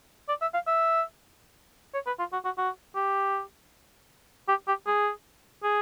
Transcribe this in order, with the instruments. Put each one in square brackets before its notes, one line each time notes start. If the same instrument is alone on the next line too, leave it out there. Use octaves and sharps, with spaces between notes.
[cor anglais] D5
E5
F5
E5
C#5
B4
F4
F#4
F#4
F#4
G4
G4
G4
G#4
G#4